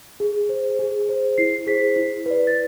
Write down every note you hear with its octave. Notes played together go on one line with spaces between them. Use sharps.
G#4
C5
G#4
C5
E4 C7
G#4 C5 B6
E4
B4 D5
A6